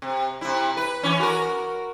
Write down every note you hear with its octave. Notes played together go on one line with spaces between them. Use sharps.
C3
C3 E4
B4
E3 C#4
F#4 A#4